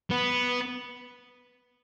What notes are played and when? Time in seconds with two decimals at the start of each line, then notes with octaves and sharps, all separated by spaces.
0.11 B3